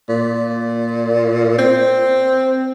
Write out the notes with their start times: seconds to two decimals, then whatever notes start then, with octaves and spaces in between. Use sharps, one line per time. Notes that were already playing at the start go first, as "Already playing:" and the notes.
0.09 A#2
1.59 C4